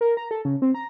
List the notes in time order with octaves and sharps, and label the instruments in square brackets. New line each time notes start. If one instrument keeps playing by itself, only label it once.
[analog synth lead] A#4
A#5
A4
C#3
C4
A#5